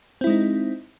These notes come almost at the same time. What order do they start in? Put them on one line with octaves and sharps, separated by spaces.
C4 E4 G#3 D#4